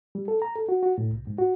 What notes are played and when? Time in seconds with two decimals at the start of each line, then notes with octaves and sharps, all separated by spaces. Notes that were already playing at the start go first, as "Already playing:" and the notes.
0.15 G3
0.28 A4
0.42 A#5
0.56 A4
0.69 F#4
0.83 F#4
0.98 A2
1.12 C2
1.27 G#2
1.38 F#4